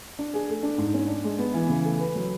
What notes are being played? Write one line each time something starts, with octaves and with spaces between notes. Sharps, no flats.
D4
G#4
A3
D4
G#2
C#4
D4
G#3
B3
E3
C#3
A3
B4
F#3